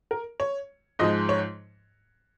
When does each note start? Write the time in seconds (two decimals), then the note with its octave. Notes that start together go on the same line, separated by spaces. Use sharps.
0.11 A#4
0.40 C#5
0.99 G#2 F3 G#3 D#5
1.29 C#5